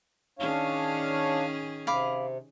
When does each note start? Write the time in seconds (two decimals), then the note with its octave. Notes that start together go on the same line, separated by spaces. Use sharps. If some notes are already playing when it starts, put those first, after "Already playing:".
0.39 D#3 C#4 D4 G#4 C#5 F5
1.87 C3 F5 B5 D6